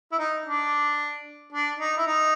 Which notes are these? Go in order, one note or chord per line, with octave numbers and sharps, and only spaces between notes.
E4
D#4
D4
D4
D#4
E4
D#4